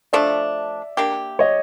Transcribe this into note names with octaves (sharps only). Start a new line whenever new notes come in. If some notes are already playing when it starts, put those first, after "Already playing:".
F3 A3 D4 D5 E5
A#3 D4 G4
C#5 D#5